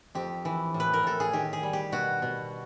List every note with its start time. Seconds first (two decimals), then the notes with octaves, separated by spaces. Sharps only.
0.15 F2 G4
0.45 E3
0.74 A2
0.80 B4
0.93 A#4
1.03 A2 A4
1.20 G#4
1.33 D#3 G4
1.53 G#4
1.63 G3
1.73 G4
1.92 B2 F#4
2.22 B2